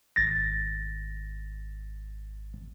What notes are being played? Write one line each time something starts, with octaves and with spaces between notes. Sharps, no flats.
G#1 A6 A#6